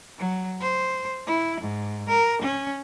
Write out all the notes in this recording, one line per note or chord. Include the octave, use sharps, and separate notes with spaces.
F#3
C5
E4
G#2
A#4
C#4